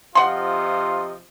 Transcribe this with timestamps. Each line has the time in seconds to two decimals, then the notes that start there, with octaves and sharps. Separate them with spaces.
0.15 C3 F3 F4 D#5 F#5 C6